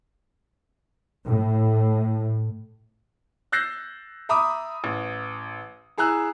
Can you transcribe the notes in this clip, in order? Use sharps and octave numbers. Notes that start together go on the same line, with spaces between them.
A2
E6 F#6 G6 A6 A#6 C7
E5 A#5 B5 D6 D#6
A1
E4 G#4 A#5 E6 F#6